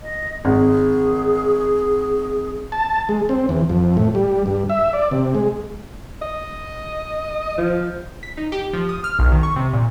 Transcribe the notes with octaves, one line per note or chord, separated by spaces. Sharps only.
D#5
G#1 G#4
A5
G#3
C4
E2
F2
A2
G3
G2
E5
D5
C3
G#3
D#5
F3
B6
D#4
G4
F3
D#6
F6
B1
D#3
C#6
C3
A#2